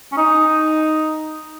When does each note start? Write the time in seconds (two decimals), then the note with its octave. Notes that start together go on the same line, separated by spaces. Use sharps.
0.12 C#4
0.17 D#4